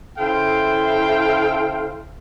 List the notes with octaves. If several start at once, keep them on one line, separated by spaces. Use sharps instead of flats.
C#3 E4 A4 C5 F5 G5